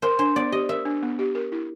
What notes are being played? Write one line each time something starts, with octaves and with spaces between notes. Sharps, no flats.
A#4 C5
D4 C5
B3 D5
G4 D#5
A#4 E5
D4
B3
G4
A#4
E4